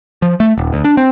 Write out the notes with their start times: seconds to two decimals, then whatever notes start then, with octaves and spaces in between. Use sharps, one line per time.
0.22 F3
0.40 A3
0.58 D#1
0.73 D2
0.84 D4
0.97 C4